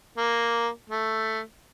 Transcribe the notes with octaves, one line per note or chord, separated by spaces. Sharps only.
A#3
A3